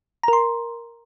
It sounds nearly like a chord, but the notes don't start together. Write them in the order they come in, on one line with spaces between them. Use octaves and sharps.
A#5 A#4 C6